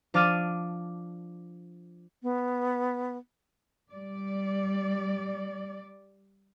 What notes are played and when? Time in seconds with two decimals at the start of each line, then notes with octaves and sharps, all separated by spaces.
0.14 F3 D4 D6 F6 A6 D#7
2.23 B3
3.91 G3 D5